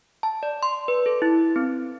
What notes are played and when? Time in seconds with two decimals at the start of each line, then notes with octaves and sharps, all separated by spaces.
0.23 A5
0.43 D5
0.63 C6
0.88 B4
1.06 A4
1.22 E4
1.56 C4